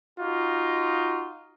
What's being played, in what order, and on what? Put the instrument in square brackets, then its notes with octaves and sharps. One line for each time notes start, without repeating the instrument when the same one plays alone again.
[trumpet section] D#4 F4 F#4